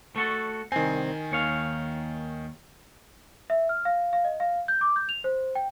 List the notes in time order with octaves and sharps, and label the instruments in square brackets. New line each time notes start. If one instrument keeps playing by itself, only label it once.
[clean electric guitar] A3 F#4 A4
[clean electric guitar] C2 C4 [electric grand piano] D#3 G#5
[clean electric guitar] D#2 C#5 F5
[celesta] E5
F6
F5
F5
D#5
F5
G6
D6
G6
F7
C5
G5